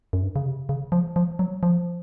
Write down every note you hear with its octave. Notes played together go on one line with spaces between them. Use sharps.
F#2
G2
C#3
C3
C#3
F3
F3
F#3
F3